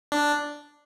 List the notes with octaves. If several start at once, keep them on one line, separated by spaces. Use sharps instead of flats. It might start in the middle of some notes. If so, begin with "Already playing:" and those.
D4